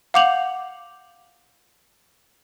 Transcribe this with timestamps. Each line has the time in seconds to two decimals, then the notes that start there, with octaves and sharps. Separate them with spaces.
0.14 F5 F#5 D6 G6 F7 F#7